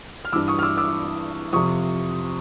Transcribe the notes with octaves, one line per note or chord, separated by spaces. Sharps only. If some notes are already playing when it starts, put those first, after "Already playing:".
F6
G2 E3 D6 E6
C#6 D#6
F6
D6 E6
D6 E6
F2 C3 F3 C#6 D#6